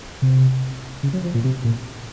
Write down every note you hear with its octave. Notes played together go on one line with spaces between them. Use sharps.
C3
C#3
F#3
F3
A#2
C3
A#2